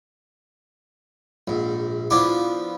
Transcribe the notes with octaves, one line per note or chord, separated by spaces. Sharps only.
A#1 G#2
F3 B3 D4 E4 D6